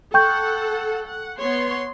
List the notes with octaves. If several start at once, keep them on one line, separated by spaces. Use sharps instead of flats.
A4 F#5 G5 C#6 G6
F#5
B3 C#5 C6